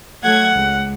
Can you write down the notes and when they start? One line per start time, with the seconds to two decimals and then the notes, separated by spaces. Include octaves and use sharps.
0.23 F#3 A3 F#5 G#6
0.52 C#2